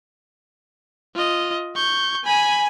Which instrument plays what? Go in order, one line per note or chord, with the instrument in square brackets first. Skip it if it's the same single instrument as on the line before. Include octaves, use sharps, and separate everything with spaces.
[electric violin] F4 D#5
C#6 G6
[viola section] G#5 [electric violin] B5